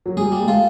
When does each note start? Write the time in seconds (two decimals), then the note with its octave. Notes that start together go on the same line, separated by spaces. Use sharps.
0.06 F#3
0.17 G3 G#4
0.32 G3 A#3
0.43 G#3
0.47 A3 F4